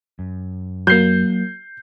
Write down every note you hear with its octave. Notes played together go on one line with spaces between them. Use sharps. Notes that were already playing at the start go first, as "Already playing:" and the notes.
F#2
F#3 A#3 G6 C7